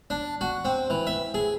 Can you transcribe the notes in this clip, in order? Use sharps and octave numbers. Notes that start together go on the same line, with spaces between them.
D4
F#4
C4
E3
E5
G#4